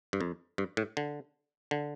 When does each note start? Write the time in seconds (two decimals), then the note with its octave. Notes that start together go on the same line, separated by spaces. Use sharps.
0.13 G2
0.21 F2
0.58 G2
0.77 A2
0.97 D3
1.71 D3